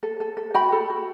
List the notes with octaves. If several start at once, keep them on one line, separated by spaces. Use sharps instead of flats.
A4
A4
A4
F#4 G5 B5
A4
F#4